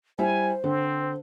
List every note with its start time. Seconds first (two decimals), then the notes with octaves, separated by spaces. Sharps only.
0.19 G3 E4 C5 E5 G#5
0.64 D3 C4